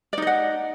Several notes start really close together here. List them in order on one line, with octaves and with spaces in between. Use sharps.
D5 D#4 D#5 F#5